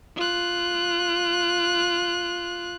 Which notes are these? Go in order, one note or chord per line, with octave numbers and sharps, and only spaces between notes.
F4 F#6